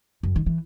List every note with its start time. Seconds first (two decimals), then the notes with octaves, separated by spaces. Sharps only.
0.23 F#2
0.36 D#3
0.46 E3